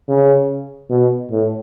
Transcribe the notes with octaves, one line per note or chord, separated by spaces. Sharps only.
C#3
B2
A2